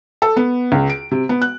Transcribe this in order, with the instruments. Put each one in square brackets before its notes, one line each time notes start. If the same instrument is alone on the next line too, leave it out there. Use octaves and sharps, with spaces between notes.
[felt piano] A4
B3
C#2
D7
C3
B3
F#6